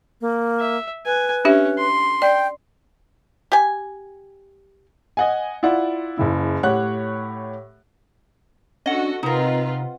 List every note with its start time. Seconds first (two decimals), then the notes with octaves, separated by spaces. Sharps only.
0.21 A#3
0.59 E5
1.06 B4 G#5
1.45 C#4 D4 G4 E5
1.78 C6
2.22 D5 G5
3.52 G4 G#5
5.17 D#5 F#5 G#5
5.63 E4 F4 D5 F#5
6.18 F#1 C#3 E4
6.63 A2 G4 C#5 F#5 F#6
8.86 C#4 D4 F#4 A4 D#5 F#5
9.23 C3 C4 D#4 F4 A#4 B4